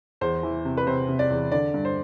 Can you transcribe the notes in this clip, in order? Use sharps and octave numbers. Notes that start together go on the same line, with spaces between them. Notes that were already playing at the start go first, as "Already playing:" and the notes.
E2 C5
E3
C3
B4
C3 C5
C3
D5
E2
D3 D5
G2
C5